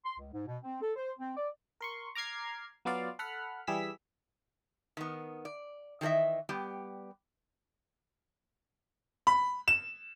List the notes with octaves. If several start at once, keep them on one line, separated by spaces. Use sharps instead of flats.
C6
C#2
G#2
B2
C4
A4
C5
C4
D5
A#4 C6 C#6
A#5 D6 F6 G#6 C7
F#3 B3 F4 D5 F5
A4 F#5 B5 F6
E3 G3 G#4 E6 B6
D#3 B3
D5
D#3 E3 G#4 D#5 E5
G3 B3 G4
B5
E7